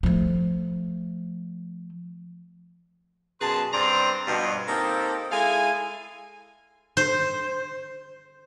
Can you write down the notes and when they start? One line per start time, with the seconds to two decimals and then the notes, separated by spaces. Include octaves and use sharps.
0.03 F3 A3
3.41 F#2 B2 G#4 B4 A5 C6
3.73 G2 C4 D5 A#5 C6
4.27 G2 B2 F3
4.67 A#3 C4 D#4 F4 G4 A4
5.32 G#3 E4 A4 F5 G#5
6.97 C5